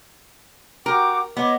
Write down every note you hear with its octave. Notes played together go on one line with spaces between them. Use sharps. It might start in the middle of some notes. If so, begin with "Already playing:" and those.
F#4 A#4 G5 D6
B3 C#5 D#5 D6